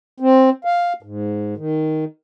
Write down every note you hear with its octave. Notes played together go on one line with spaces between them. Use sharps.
C4
F5
G#2
D#3